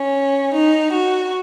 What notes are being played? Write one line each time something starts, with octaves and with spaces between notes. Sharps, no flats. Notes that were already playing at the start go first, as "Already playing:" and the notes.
Already playing: C#4
D#4
F#4